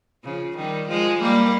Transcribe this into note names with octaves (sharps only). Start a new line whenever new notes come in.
C#3 F3
D#3 G3
F3 G#3
G3 A#3